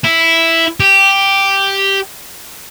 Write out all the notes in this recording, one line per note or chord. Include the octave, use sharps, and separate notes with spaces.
E4
G4